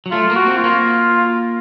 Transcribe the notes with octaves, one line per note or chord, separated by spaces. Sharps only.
F#3
A3 F4
A#3
F#4
C4
F4
A#3